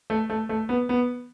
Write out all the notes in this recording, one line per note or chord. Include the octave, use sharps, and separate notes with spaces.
A3
A3
A3
B3
B3